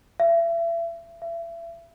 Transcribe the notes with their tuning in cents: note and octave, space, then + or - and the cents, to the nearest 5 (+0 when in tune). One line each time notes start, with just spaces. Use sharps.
E5 +35
E5 +35